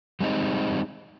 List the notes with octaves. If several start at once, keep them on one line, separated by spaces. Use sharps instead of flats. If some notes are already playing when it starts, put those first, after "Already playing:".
G3 G#3 C4 D#4